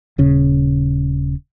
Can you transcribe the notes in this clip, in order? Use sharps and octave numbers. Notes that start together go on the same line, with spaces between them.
D#1 C#3